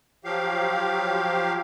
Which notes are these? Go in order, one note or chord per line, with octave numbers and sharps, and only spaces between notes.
F3 F#3 G4 F5